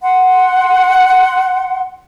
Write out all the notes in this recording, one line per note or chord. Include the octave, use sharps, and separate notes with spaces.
F#5 C6